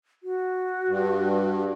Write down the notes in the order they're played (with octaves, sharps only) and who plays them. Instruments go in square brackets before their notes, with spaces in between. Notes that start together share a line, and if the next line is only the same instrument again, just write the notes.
[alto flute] F#4
[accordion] G2